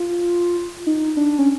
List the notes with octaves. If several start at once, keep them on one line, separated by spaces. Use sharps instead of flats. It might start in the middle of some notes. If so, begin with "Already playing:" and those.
Already playing: F4
D#4
D4
C#4